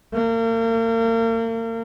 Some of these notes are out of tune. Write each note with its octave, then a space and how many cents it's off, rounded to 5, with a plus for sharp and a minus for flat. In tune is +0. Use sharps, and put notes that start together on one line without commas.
A#3 -40